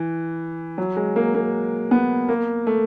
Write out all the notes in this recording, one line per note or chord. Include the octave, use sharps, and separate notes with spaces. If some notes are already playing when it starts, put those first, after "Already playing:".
Already playing: E3
F#3
G#3
A#3
A#3
B3
A#3
A3